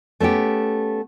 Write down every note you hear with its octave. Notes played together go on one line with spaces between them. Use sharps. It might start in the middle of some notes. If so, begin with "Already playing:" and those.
A3 B3 C#4 G4